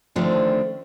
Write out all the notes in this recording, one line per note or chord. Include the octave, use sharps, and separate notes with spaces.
D3 D#3 F3 A3 C4 D4